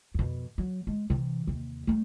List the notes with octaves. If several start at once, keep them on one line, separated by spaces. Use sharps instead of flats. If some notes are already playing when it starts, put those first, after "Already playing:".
F2 B2
F#3
G#3
C3 E3
D#2 C3
G3 A3